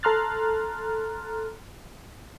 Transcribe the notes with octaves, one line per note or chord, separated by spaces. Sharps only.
A4 A#5 C6 F6 F#6 A6